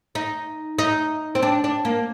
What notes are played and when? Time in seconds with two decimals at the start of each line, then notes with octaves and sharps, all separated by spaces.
0.15 D#4
0.78 D#4
1.35 C4
1.42 D4
1.64 D4
1.85 A#3